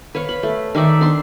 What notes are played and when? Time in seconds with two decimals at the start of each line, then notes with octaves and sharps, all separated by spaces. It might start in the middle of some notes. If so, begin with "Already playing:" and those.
0.15 B4 C#5 F5 C#6
0.29 B5
0.43 A3
0.75 D#3 D#4 D5 E5
1.01 D4 C6